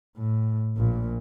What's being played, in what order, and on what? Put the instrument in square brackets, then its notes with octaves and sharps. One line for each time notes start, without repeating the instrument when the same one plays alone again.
[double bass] A2
A#1 A#2